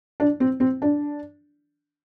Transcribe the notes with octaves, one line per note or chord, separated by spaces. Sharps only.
D4
C4
C4
D4